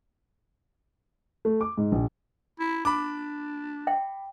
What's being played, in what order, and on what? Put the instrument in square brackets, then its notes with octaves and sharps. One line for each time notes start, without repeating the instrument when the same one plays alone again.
[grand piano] A3
D6
G#2
A#1
[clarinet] E4
[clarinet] D4 [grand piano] B5 D6
[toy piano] E5 G5